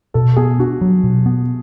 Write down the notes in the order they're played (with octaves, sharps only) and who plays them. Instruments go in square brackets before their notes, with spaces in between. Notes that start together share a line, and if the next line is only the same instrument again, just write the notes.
[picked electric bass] B2 [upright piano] A4
[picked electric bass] B3 [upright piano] G#4
[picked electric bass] D4 [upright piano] F#4
[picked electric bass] F#3
B2
B3